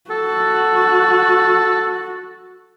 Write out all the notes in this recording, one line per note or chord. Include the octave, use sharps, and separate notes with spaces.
F#4 A4